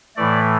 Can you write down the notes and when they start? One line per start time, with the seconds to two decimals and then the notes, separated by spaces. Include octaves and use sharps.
0.17 A2 E3 A3 D5